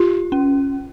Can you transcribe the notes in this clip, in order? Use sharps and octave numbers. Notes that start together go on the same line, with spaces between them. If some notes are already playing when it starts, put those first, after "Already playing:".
Already playing: F4 G4
C#4